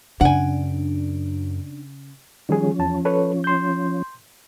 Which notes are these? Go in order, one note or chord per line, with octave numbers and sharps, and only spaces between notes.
F#2 C#3 D4 F#5 G#5
D#3 F3 G3 C#4 G#4
E2 A5
A4 B4 C#5
C6 G6